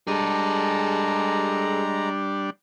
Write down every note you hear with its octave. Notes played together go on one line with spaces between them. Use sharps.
G3 G#3 D4 G#4 A4 A#5